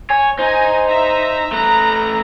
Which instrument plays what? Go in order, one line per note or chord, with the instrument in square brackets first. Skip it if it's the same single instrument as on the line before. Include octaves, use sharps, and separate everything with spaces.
[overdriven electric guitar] C#5 [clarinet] G#5
[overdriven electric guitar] D#4 [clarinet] C5 [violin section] G#5 A#5
[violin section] E5 A#5
[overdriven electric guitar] A3 B4 [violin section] A#5